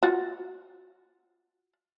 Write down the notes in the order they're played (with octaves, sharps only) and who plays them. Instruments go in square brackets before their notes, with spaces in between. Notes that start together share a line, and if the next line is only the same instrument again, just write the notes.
[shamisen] F4 F#4